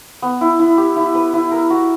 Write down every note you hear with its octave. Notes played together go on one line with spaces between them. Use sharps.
B3
E4
E4
G4
E4
B4
E4
A#4
F#4